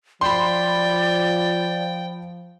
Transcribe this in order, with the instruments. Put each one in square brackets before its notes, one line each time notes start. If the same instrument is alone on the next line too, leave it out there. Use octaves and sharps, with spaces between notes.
[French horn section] F3 [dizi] D5 [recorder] G5 [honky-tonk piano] B5 C6